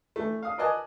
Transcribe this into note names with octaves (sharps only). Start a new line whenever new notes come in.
E3 A3
F5 D#6
A#4 B4 D5 D#5 G#5 A5